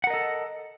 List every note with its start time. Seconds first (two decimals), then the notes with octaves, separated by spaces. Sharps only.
0.04 F#5
0.07 A#4
0.10 D#5
0.14 A4